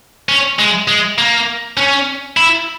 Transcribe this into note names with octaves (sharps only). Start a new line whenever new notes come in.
C#4
G#3
G#3
A#3
C#4
E4